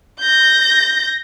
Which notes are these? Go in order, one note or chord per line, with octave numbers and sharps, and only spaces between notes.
G6 A#6